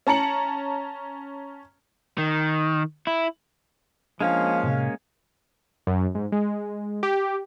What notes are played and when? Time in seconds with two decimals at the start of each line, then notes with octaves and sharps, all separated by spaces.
0.07 C#4 A5 A#5 C#7 F#7
2.18 D#3
3.07 E4
4.21 F3 G#3 A#3 C#4 D4 F5
4.63 A2 C3
5.87 F#2
6.15 G#2
6.32 G#3
7.03 G4